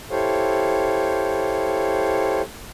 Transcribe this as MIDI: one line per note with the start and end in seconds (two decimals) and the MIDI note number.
0.11 2.42 64
0.11 2.42 67
0.11 2.42 69
0.11 2.42 72
0.11 2.42 73
0.11 2.42 77